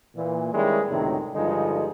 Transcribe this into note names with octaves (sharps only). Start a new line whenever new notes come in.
A#2 E3
D#3 G3 G#3 A#3 C#4 E4
C#2 A2 C3 D#3 F#3
G2 D3 F3 G3 G#3 D#4